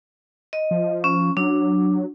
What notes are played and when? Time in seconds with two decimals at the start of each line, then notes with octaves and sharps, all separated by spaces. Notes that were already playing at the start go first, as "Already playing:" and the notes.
0.53 D#5
0.71 F3
1.04 C#4
1.37 F#3 D4